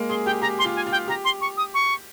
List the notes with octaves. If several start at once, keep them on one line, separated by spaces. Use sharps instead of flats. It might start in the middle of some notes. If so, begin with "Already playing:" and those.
Already playing: G#3 A#3
G#4 C6
G4 G5
G4 A#5
C6
F4
G#5
F4
G5
G4 A#5
C6
C#6
D#6
C#6